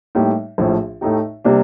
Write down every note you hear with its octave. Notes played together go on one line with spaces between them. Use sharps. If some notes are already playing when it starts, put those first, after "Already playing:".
A2 G3 A#3 D#4 G4
A#1 A2 F3
A2 A3 D#4 G4
C3 G3 A#3 D4